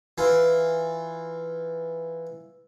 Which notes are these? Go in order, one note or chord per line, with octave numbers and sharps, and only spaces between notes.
E3 F4